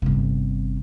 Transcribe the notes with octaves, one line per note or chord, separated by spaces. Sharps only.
G1 C3